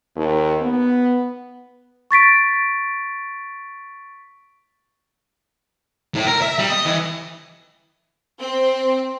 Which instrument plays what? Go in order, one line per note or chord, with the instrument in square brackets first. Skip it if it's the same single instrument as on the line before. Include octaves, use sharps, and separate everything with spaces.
[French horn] D#2
B3
[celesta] C#6 A6 B6 D7
[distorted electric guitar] A2
A#4
E5
G3
D#5
E3
[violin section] C4